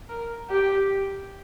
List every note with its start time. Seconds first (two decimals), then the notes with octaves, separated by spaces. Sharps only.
0.09 A#4
0.50 G4